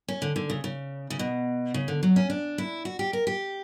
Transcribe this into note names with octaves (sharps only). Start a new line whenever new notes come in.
C#4
D3
D3
C#3
C#3
C#3
B2
C#3
D3
F#3
C#4
D4
E4
F#4
G4
A#4
G4